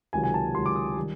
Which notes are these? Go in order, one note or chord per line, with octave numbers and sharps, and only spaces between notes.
C#2 C3 D#3 F#3 G#5
G#5
A5
C#2 C3 D#3 F#3 C6
D6
D#6
D#3 G3